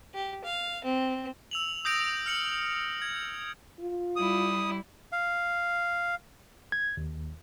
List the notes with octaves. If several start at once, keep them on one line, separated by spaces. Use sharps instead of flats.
G4
F5
C4
E6 F7 F#7
D#6 G6 A#6 D7 F7
F6 C#7 F#7
G#6
F4
G3 E4 D#6
F5
G#6
D#2